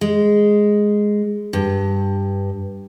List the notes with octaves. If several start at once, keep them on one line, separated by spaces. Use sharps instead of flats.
G#3
G2